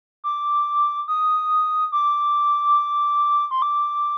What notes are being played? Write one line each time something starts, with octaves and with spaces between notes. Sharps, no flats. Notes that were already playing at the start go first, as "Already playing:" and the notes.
D6
D#6
D6
C6
D6